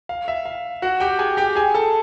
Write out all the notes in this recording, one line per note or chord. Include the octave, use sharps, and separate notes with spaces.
F5
E5
F5
F#4 F#5
G4 G5
G#4 G#5
G4 G5
G#4 G#5
A4 A5